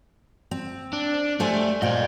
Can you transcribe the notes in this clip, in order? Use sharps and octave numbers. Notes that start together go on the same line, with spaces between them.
C4
D4
G3 A3 C5 G#5
A#2 C5 D#5 G5